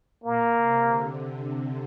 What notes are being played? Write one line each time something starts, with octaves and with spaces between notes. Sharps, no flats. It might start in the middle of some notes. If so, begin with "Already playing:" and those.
A#2 A#3
C3
D3